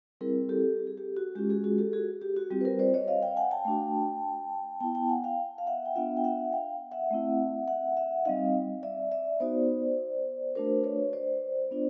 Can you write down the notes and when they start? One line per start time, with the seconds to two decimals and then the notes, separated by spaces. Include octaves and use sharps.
0.21 G3 C4 E4 G#4 A#4
0.49 G4 A4
0.87 G#4
0.97 G4
1.17 F#4
1.35 G#3 C#4 F4 G4
1.49 F#4 G#4
1.64 F#4 G#4
1.78 G4 A4
1.93 F#4 G#4
2.22 G4
2.36 F#4
2.51 G3 C4 F4 G4
2.61 B4
2.65 A#4 C5
2.79 C5 D5
2.94 C#5 D#5
3.08 D#5 F5
3.23 F5 G5
3.37 F#5 G#5
3.51 G5 A5
3.65 A3 D4 F#4
4.80 B3 E4 G5 A5
4.95 G5 A5
5.09 F#5 G#5
5.24 F5 G5
5.58 F5
5.67 E5 F#5
5.86 G5
5.95 B3 D4 F4 E5 F#5
6.17 G5
6.24 E5 F#5
6.52 F5 G5
6.91 E5 F#5
7.10 A3 C4 E4
7.68 E5 F#5
7.97 E5 F#5
8.25 G3 C4 D#4 D#5 F5
8.83 D5 E5
9.12 D5 E5
9.40 B3 D#4 F#4 C5 D5
10.55 A3 D4 F#4 A#4 C5
10.84 B4 C#5
11.13 C5 D5
11.71 B3 D4 F4